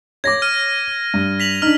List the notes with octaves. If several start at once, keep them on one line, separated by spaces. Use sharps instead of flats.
C#5 D6 G#6 A#6
F6 D#7
G2
B6 F7 F#7
D4 D#4 F6